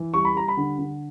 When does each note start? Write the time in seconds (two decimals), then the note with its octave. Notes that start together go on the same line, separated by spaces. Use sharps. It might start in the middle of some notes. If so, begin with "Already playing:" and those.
Already playing: E3
0.14 G3 C#6
0.25 B5
0.35 G3 A#5
0.48 B5
0.57 D3
0.79 D3